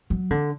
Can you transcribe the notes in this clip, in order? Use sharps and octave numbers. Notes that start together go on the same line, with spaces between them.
F#3
D3